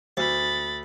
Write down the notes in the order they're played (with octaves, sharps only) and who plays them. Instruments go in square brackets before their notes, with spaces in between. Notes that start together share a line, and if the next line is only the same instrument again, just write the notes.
[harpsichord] D2 [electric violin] B5 A6